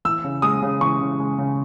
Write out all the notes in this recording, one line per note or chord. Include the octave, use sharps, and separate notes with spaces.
E3 E6
C#3
G#3 D#6
C#3
E3 C#6
C#3
G#3
C#3